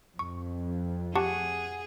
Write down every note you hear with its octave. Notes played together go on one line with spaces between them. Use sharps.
F2 C#6
G4 G#4 F#5 A5 C#6